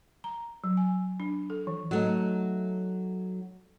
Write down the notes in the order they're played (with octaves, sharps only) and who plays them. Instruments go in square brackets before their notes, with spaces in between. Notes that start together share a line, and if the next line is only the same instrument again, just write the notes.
[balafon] A#5
F#3
G#5
D4
A4
E3
[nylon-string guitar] F#3 A3 D#4